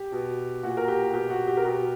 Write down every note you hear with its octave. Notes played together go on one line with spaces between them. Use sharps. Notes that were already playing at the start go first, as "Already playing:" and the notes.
Already playing: G4
B2
A#2 F#4
A#4
G4
B2 G4
F#4
G4
A#4
B2 G4